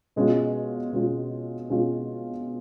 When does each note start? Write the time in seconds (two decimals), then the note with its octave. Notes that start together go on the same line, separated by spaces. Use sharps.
0.16 B2 G#3 C#4 F4
0.92 B2 G#3 C#4 F4
1.70 B2 G#3 C#4 F4